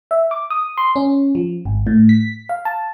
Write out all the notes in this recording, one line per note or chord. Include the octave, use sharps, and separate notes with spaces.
E5
D6
D#6
C6
C#4
F3
G#1
A2
B6
F5
A5